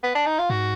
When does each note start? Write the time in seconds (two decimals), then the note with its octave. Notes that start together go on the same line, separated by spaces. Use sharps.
0.03 B3
0.15 D4
0.26 D#4
0.39 F4
0.50 G#2 F#4